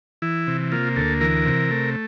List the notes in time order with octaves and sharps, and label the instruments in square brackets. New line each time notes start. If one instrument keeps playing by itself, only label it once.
[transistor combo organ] E3 E4
C3
A#3 F4
D2 A4
E3 A#4
C3
A3